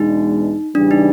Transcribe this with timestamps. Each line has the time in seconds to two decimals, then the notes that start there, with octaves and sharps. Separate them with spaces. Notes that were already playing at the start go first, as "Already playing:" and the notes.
Already playing: E2 B2 G#3 B3 D4 D#4
0.75 E2 C#3 E3 G3 D4
0.91 D#4